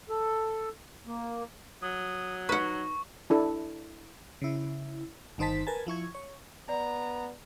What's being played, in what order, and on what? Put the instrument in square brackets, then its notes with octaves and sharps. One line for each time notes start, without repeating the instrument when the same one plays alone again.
[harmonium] A4
A#3
[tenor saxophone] F#3 [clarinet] D#6
[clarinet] D#4 [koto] B4 F#5 [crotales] C#6
[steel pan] D4 E4 A4
[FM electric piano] C#3 E4
G1 D#3 D#4 C5 A5 B6
A#4 B4 G#5 A5
F3 E4 C#6 G#6
C#5
[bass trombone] B3 [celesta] D5 [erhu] A#5